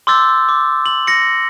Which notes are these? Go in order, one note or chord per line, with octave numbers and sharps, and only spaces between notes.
C6 D6 E6 G6 A6
D6
F#7
A#6 C#7